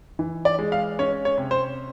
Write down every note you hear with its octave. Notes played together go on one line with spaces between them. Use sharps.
E3
D5
G#3
F5
C#4 C#5
C#5
C3
C5